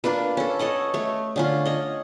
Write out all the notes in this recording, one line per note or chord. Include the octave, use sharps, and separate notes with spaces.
A#3 D4 F4 B4
C#4 A4
A4 C#5 D#5 F#5
A3 C#5
D3 C#4 F4
C#5 D#5